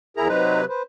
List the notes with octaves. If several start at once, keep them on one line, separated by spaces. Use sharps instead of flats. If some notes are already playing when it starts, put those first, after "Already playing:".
E2 E4 G#4 A#4 A#5
C3 F#3 D#4 B4 C5 A#5
B4 C5